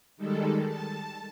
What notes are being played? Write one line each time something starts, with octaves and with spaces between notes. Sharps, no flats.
D#3 G3 G#3 A4
A5